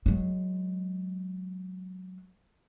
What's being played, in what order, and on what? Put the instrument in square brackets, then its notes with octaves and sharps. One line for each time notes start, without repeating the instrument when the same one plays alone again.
[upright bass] F#3 G#3